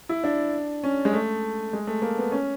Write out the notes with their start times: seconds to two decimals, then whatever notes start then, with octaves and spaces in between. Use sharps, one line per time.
0.09 E4
0.24 D4
0.84 C#4
1.05 G#3
1.13 A3
1.73 G#3
1.87 A3
2.02 A#3
2.18 B3
2.32 C#4